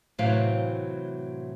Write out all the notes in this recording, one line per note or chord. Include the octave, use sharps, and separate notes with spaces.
A2 C3 E3 F#3 C4 F5